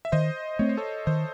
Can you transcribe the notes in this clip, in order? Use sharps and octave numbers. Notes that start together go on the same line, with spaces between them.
E5
D#3 C5 D#5
A3 C4 C#5
C5
A4 C#5
D#3 C5 D#5